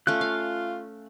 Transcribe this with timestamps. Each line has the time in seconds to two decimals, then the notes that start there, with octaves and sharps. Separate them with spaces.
0.07 A3 C#4 F4 F#6
0.21 F5